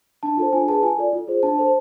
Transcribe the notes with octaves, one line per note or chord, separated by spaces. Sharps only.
D4 A5
F4 A4 C5 A5
D4 G#5
G#4 B4 A5
F4 G#5
A4 D5
F4
G#4 C5
D4 A5
A4 C5